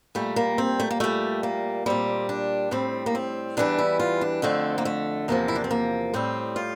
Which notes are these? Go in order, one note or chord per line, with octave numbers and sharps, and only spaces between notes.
A#2 G3 A3
A#3
C4
A3
A#3
A#2 G3 A3
A#3
A#2 G3 C4
D4
A2 G3 C4
A#3
C4
E2 E3 G3 D4
E4
F4
D4
F2 D3 A3 C4
A#3
A3
E2 C3 F3 A#3
E4
D4
C4
A#3
A2 G3 C4
F4